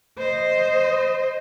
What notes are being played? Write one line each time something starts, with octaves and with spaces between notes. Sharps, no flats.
C5 D#5